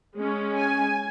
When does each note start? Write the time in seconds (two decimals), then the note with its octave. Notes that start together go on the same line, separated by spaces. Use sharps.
0.16 G#3 C#4
0.56 G#5